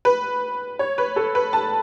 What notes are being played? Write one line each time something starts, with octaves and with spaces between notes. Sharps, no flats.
B4
C#5
B4
A4
B4
A5